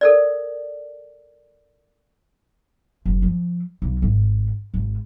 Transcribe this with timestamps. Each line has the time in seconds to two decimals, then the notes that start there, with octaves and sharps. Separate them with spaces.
0.01 A4 A#4 D5
3.06 F#1
3.22 F3
3.82 B1
4.02 G#1
4.74 G#1